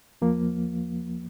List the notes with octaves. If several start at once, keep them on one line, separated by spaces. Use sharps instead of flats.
E2 F3 A#3